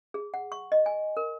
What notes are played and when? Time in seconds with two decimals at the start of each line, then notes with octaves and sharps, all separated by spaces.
0.14 G#4
0.34 F#5
0.52 C#6
0.72 D#5
0.86 G#5
1.17 A#4